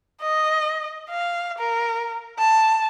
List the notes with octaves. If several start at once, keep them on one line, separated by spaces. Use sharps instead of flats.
D#5
F5
A#4
A5